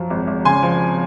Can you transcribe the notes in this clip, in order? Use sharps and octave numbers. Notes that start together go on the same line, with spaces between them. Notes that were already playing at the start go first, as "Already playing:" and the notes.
Already playing: F#2 F3
G#1
G#1
C#3 G#5 C6
F3